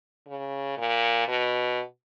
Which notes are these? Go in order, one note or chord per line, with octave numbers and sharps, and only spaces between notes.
C#3
A#2
B2